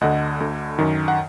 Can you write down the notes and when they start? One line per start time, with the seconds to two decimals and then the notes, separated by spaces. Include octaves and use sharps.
0.01 D2 D3 D#5 F#5
0.40 D2 D3
0.79 F#2 D#3
1.08 F#5